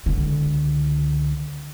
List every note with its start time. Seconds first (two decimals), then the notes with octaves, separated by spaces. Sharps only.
0.06 C#2 D3